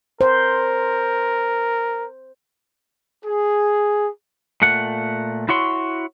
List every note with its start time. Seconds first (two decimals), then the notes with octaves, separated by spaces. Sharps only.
0.21 A#4 C5
3.24 G#4
4.62 A#2 A3 F#5
5.49 E4 F#4 C#5 C6